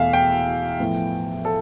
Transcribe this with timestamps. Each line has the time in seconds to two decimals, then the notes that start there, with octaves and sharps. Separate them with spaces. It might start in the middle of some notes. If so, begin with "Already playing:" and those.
Already playing: E2 B2 A3 E5 F5
0.13 G5
0.80 A2 F3 B3
1.45 A4